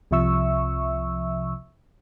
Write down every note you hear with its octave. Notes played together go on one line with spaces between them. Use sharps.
C2 C3 F3 E5 C#6 E6